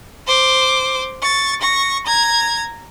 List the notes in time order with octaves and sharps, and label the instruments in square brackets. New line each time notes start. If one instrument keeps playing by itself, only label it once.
[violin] C5 D6
C#6 A6
C#6 A#6
A#5 G#6